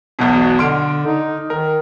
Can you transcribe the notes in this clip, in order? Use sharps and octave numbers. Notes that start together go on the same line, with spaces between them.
B1 E2 B2
F#4
D3 C6 F6 D7
D#4
D#3 A#4